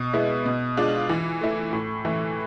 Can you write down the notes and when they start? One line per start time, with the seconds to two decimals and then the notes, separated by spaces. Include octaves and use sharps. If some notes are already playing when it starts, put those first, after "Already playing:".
Already playing: B2
0.13 G#3 B3 E4
0.45 B2
0.77 G#3 D4 F4
1.09 E3
1.41 A3 E4
1.73 A2
2.05 E3 A3 E4